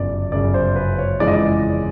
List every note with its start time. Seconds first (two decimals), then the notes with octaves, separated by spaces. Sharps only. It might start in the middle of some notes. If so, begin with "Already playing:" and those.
Already playing: G1 F#2 C#3 D5
0.32 G1 F#2 C#3 D5
0.54 C5
0.76 B4
0.98 C#5
1.20 F2 C#3 E3 G#3 D5
1.27 D#5
1.35 D5